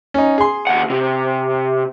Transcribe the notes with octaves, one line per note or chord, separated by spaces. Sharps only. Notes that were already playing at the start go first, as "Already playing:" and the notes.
C#4 D#4
G#4 C6
D#2 F#5
C3